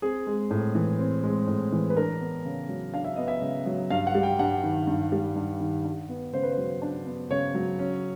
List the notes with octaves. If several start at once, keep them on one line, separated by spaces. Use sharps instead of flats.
C4 G#4
G#3
A2
E3
C4
G#3
A2
E3
B4
D4 A#4
B3
C#3
F#3
D4 F5
E5
B3 D#5
E5
C#3
F#3
G2 F5
F#5
G3
G5
G2 F#5
D#3
G2
G3
G2
D#3
D4
B3
C#3 C5
B4
C5
F#3
D4
B3
C#3 C#5
F#3
C#4